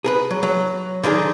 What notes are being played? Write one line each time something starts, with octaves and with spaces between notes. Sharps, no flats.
G#4 A#4 B4
F#3
F#3
D3 D#3 D#4 G#4